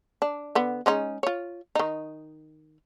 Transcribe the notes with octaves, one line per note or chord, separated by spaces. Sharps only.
D4
D3 B3
G#3 C#4 D#4
F4 C#5
D#3 D#4